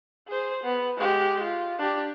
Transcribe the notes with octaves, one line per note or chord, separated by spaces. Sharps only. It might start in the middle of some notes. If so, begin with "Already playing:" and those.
G#4 C5
B3
G#3 G4
F4
D4 G4